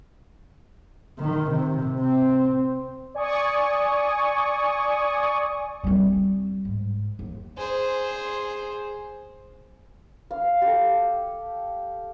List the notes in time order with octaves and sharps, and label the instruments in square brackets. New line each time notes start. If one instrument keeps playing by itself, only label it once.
[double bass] D#3
C3
C4
[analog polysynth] D5 G#5 C#6 D#6
[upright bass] G3 C4
G#2
D#2
[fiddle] G#4 C5
[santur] F5
G4 A4